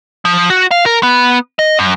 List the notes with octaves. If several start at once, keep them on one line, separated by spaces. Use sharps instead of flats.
F3
F#4
F5
A#4
B3
D#5
F#2